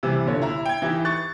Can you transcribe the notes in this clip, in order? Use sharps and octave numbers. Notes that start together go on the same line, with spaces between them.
C3 E3 G3
A#2 D3 C#5
E4 A#5
G5 G#6
E3 D#4 E4 G4
C#6 F#6 A6